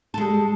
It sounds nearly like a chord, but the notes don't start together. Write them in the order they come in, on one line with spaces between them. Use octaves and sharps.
A4 G#3 G3